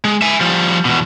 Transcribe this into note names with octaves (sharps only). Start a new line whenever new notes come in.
G#3
E5 G#5
F3 G3
E2 B2